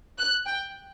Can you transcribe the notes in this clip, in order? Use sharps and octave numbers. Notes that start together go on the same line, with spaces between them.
F#6
G5